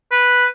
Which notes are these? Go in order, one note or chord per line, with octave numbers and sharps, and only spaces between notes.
B4